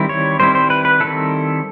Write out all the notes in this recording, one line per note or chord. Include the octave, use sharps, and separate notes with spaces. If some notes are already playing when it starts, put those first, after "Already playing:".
Already playing: D#3 G3 C4 E4
C#5
D#3 G3 C4 E4 C5
C5
B4
B4
D#3 G3 C4 E4 A4